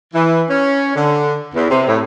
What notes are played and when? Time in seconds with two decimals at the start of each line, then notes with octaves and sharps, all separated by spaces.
0.14 E3
0.50 C#4
0.95 D3
1.55 E2
1.71 C3
1.87 A2